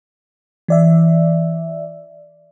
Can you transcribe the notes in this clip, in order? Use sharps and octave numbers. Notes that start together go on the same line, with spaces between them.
E3 D5 E5